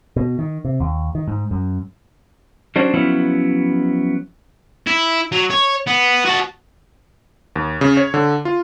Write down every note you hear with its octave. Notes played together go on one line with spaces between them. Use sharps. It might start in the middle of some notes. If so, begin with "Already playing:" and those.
B2
D#3
C3
D#2
D#3
G#2
F#2
F#3 C#4 D4 F#4 C5
F3 F#3 B3 C#4 E4
E4
F#3
C#5
B3
F#4 A5
D#2
C#3
C#5
D3
F4